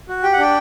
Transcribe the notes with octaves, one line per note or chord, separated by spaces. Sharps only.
F#4
G4 G5
F#5
D4 G5